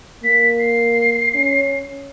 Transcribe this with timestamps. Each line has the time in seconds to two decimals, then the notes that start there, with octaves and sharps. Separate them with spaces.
0.24 A#3 B6
0.59 C7
1.35 C#4